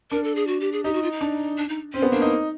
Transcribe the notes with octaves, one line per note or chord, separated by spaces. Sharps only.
D4 A#4
A4
G#4
F#4
G4
G#4
D#4 G4
F#4
F4
D#4
D4
D4
D#4
C4 C#4
B3
A#3 D4
D#4